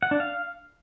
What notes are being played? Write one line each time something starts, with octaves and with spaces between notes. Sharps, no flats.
F#5
D4
F5